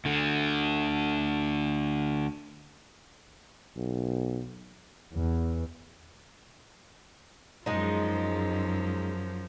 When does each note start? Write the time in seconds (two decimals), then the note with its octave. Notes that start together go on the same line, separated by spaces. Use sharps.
0.05 D2 D3
3.76 B1
5.14 E2
7.66 F#2 F3 G#3 D#4